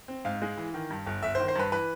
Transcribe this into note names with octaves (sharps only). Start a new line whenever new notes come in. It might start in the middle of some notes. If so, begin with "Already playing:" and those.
C4
G#2 F5
G#3
E3
D#3
G2
G1
G1 E5
C5
D#3
C5
G2 B4
E3 B4